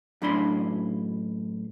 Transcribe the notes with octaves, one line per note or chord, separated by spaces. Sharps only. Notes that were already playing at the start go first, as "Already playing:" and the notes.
F#2 A2 D4 B5 C6